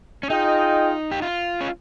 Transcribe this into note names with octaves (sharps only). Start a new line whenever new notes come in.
C#4
D#4 F4 G#4 D#5 G5
G4
F4
C#4